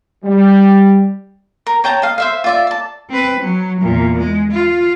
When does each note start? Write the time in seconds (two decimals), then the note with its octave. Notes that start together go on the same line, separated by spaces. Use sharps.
0.25 G3
1.67 A#4
1.84 C#5 G5 A5 A#5
2.02 D#5 F5
2.18 C5 E5 F5
2.44 F4 D5 E5
2.67 D5 A5
3.09 C4 B4
3.40 F#3
3.82 E2 A#2
4.19 G#3
4.52 F4